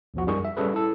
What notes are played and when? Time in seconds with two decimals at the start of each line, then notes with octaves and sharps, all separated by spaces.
0.14 B1 E2 F3 F#4
0.27 F#2 G3 D#4 G#4 A#4 C#6
0.45 E5
0.57 G3 C#4 G#4 A4 B4
0.74 E4 A4